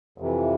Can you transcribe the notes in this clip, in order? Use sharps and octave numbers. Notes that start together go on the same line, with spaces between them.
F2 C3 E3